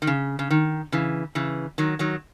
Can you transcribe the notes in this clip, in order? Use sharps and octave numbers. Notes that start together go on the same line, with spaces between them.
D#3
C#3
C#3
D#3
C#3 E3
C#3 E3
D#3 F#3
D#3 F#3